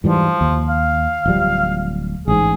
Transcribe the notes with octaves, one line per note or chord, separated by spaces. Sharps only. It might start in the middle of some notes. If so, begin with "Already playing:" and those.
G#2 E3 F3 G3
D#2
F5
D1 F3 G3
A1 G#2 G#4